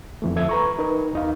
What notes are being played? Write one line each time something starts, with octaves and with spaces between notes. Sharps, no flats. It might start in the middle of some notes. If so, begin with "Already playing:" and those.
F2 E3 A3
D2 F3 A4 E5 G#6
B4 A#5 C#6
D#4 A#4 B4
D#2 D#4 F5